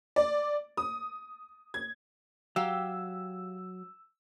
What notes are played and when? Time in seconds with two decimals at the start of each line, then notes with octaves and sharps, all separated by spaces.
0.16 D5
0.77 D#6
1.74 G#6
2.56 F#3 G4 F5 G5 E6